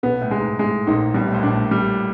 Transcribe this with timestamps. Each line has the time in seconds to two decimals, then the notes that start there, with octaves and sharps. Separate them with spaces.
0.03 B1 B2 B3
0.21 A2
0.31 G#3
0.40 G#2
0.59 A2 G#3
0.87 A#1 A#2 D#4
1.14 B1 B2 G3
1.27 A2
1.34 A#1 A#2
1.43 D4
1.52 A2
1.71 G3